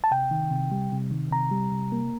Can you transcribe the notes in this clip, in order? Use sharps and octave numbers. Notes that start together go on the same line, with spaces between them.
A5
C3 G5
D#3
C3
G3
C3
D#3
C3 A#5
G3
C3
A#3